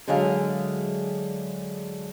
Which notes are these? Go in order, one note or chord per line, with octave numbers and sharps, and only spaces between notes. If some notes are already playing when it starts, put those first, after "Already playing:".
D3 F#3 G#3 G#4 E5 F5